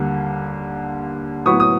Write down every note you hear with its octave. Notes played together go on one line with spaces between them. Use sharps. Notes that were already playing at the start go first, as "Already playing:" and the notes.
Already playing: D#2 D3 G3 A#3
A2 F#3 B3 E4 C#6 D#6
D#6